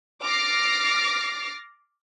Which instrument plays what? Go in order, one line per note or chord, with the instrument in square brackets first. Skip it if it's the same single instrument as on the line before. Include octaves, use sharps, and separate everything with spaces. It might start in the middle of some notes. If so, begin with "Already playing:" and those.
[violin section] D6 F6 A6 A#6 C7 D7